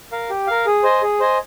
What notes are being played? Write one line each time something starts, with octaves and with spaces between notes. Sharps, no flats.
A#4 F5
G4
A#4 F5
G#4
C5 D#5 G#5
G#4
C5 D#5 G#5